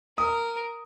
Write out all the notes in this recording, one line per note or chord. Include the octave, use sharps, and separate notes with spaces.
A#4 D#6